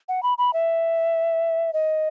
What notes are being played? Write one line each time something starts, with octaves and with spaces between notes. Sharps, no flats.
F#5
B5
B5
E5
D#5